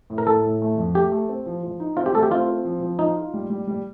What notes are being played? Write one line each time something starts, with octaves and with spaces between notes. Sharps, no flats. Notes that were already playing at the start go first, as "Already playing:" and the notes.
A2
A#4
A2 A4
A2
A3
F2
A3 G4
A3
C4
F3
F3
D#4
C4 F4
G4
A3 A4
G4
C4 F4
C4
F3
F3
D#4 F4
F4
G3
G3
G3